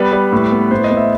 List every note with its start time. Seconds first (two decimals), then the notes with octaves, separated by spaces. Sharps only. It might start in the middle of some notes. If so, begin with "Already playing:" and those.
Already playing: G3 B3 B4
0.13 G3
0.32 A2
0.52 B3
0.71 A2 C5
0.84 D#5
0.91 B3
0.97 E5